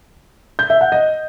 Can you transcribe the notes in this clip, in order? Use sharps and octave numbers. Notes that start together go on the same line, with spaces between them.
G6
E5
F#5
D#5